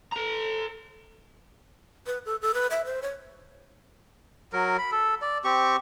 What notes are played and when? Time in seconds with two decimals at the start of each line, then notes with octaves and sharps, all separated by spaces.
0.12 A4 A#5
2.07 B4
2.26 A4
2.42 A4
2.54 B4
2.71 E5
2.85 C5
3.02 C#5
4.53 F#3 A#4
4.78 B5
4.92 A4
5.22 D5
5.44 C4 G4 C#6